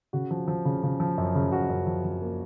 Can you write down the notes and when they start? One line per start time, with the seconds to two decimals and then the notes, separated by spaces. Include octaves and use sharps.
0.13 C#3 F#4
0.31 F3
0.48 F3
0.65 C#3
0.83 C#3
1.00 F3
1.18 F#2
1.35 C#3
1.52 F#2 F#4
1.69 F#2
1.87 F3
2.05 F3
2.22 A#3